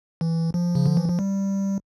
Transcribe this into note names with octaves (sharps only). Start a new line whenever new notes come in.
E3
F3
C#3
D3
E3
F3
G3